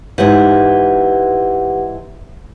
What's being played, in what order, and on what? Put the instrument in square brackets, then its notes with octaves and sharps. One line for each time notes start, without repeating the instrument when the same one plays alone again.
[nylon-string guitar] G#2 E3 [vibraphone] G4 B4 F#5